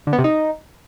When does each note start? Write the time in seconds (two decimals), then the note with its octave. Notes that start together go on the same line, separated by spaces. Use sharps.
0.07 D3
0.13 B3
0.18 C3
0.24 D#4